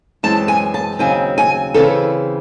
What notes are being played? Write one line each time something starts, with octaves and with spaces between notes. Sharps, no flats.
F#2 E3 G#3 C4 A5
G#5
A5
D#2 C#3 F#3 C4 G#5
G#5
C#3 E3 C4 A4